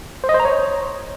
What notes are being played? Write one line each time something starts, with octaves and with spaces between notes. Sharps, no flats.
C5
D#5
C5
A#5
C#5